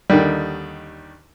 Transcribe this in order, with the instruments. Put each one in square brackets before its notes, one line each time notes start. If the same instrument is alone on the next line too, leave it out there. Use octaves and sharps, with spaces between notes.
[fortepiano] D#2 D3 D#3 G3